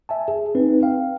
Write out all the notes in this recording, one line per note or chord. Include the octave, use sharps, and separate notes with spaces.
E5 G#5 A5
G#4
C4 D#4 B4
F5 G5